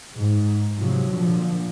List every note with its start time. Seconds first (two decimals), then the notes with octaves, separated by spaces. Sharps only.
0.16 G#2
0.77 G#2 C3 F3 F#3
1.11 A#2 D3 F3